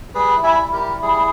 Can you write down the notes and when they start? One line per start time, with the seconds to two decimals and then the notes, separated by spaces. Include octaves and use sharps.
0.14 G3 G#4 B4
0.36 E4
0.43 E5 G#5
0.58 G3
0.73 G4 A#4
0.80 E4
1.02 G3 G#4